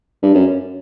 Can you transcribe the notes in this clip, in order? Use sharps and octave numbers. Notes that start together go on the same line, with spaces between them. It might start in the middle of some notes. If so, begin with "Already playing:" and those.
G2
F#2